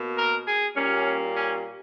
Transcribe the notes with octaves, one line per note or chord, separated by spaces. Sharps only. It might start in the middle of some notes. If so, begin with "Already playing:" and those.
Already playing: B2 A#3
A#4
G#4
A#2 G3 A#3 C#4
C#4